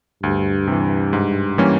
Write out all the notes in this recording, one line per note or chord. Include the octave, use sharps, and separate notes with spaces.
D2 G2
C3 E3
G#2
E3 G3 A#3 C#4